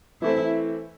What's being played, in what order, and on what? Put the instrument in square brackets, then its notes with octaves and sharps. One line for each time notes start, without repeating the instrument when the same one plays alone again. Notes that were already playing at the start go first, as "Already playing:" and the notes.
[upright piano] E3 A3 C4 [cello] E4